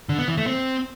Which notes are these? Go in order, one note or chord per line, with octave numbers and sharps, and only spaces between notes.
D3
B3
E3
A3
C4